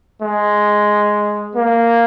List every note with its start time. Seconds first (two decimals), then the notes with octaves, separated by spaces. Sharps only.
0.22 G#3
1.56 A#3